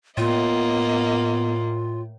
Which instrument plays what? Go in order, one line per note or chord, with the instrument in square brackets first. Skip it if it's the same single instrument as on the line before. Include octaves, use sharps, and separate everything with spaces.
[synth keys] A2 [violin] A#3 D#5 [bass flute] B3 [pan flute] F4